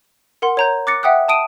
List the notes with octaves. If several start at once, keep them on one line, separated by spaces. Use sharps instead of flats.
A#4 F#5 C6
C#5 A#5 G6
D6 F#6 A6 A#6 C#7
E5 F#5 G5 D#6 F#6
A5 D#6 D7 D#7